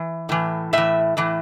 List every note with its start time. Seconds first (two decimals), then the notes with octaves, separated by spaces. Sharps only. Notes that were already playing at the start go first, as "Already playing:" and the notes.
Already playing: E3
0.29 A2 E3
0.73 A2 E3 E5
1.17 A2 E3